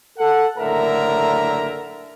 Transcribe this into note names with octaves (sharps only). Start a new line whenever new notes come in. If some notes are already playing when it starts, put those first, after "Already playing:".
A4 F#5
F#1 A2 D3 A#4 E5 A#5